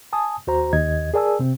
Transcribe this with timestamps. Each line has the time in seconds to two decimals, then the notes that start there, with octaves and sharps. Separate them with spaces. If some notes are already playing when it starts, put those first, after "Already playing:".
0.13 G#5 A5 D#6
0.47 D#2 F#4 C5 A#5
0.73 D#2 D#5 G#6
1.14 G#4 A#4 D5 G#5 A5 E6
1.39 C3 C4